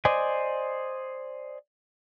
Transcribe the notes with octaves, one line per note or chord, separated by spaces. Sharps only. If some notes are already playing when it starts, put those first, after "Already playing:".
C5 D5 D#5 G#5